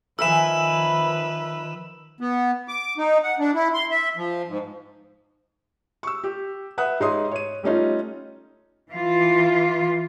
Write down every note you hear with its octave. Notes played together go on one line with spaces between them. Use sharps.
D#3 F3 A#4 B4 E5 G#5 E6 E7
B3
D6
D#4
F#5
D4
E4
C6
E5
F3
G#2
C#6 E6
G4
B4 E5 F#5 D#6 F#6
G#2 D#4 C#5 C6 D#6
C#5 D#7
G3 A3 C#4 D#4 F4
E3 F4